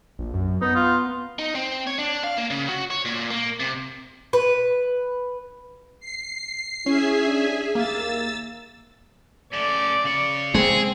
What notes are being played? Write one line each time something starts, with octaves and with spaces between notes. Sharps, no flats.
A#1
F#2
B3 D#4
F4
D#4
C4
C#5
D4
F5
A#3
C#3
F#4
C#5
A#2
A#3
C3
B4
C7
C#4 E4 G#4 E5 G#5
D4
D#2 A#3 E6 A6
A3 C#4 D5
C#3 C#5
G#3 C4 G#4